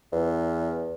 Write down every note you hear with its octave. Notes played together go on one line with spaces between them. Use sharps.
E2